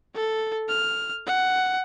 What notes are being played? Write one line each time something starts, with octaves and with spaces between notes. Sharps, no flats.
A4
F6
F#5